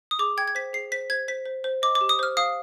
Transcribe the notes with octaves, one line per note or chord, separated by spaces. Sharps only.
D#6
G#4 D6
G5 G#6
G#6
C5 B6
G#4 C7
C5 B6
C5 G#6
C5 B6
C5
C5
D#5 D6
D6
G4
D#6
C5 F6
F5 D#6